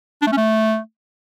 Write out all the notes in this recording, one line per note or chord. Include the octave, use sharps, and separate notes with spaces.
D4
A3
C#4
A3